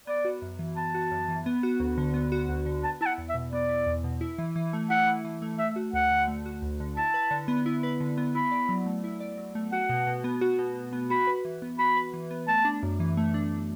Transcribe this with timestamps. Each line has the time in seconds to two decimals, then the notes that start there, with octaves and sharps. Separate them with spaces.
0.07 B3 D5
0.25 F#4
0.42 F#2
0.59 E3
0.77 B3 A5
0.94 F#4
1.11 F#2
1.28 E3
1.46 B3
1.63 F#4
1.80 D2
1.98 D3
2.14 B3
2.32 F#4
2.49 D2
2.66 D3
2.84 B3 A5
3.01 E4 A5
3.06 F#5
3.18 E2
3.29 E5
3.34 B2
3.52 B3 D5
3.69 E4
3.87 E2
4.04 B2
4.21 E4
4.38 E3
4.56 E3
4.73 A3
4.90 E4 F#5
5.07 E3
5.25 E3
5.42 A3
5.58 A3 E5
5.76 F#4
5.93 D2 F#5
6.11 D3
6.28 A3
6.46 F#4
6.62 D2
6.80 D3
6.97 E4 A5
7.14 B4
7.31 D3
7.48 B3
7.66 E4
7.83 B4
8.00 D3
8.18 B3
8.35 E4 B5
8.52 D5
8.69 F#3
8.86 A3
9.04 E4
9.20 D5
9.38 F#3
9.55 A3
9.72 F#4 F#5
9.89 B2
10.07 B2
10.24 B3
10.41 F#4
10.59 B2
10.75 B2
10.93 B3
11.10 F#4 B5
11.27 B4
11.45 E3
11.62 B3
11.79 F#4 B5
11.97 B4
12.14 E3
12.31 B3
12.48 A3 A5
12.65 D4
12.83 F#2
13.00 E3
13.17 A3
13.34 D4